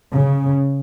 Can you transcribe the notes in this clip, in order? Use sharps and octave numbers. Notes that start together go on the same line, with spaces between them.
C#3